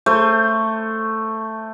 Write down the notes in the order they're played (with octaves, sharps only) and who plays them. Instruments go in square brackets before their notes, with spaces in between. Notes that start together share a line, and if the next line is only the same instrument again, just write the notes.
[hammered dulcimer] A3 C5